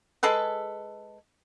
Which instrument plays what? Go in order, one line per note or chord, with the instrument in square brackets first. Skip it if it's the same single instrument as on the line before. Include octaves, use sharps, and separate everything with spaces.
[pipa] G#3 G#4 A4 B4